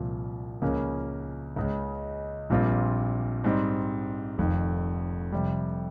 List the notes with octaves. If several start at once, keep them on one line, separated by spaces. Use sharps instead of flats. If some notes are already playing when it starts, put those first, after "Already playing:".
Already playing: C2 A#2 F3
C#2 C#3 F3 A#3 C#4
C#2 C#3 G#3
A#1 A#2 G3 C4 F4
G#2 G3 C4 D#4
F1 F2 D#3
F2 C3 G3